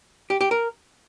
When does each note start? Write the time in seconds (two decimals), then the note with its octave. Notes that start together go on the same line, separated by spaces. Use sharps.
0.30 G4
0.41 G4
0.51 A#4